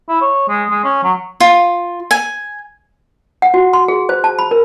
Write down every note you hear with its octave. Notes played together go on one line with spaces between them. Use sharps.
E4
C#5
G#3
G#3
C#4
F#3
F4
G#5
F#5
F#4
C6
G#4
C5
A5
B5
A#4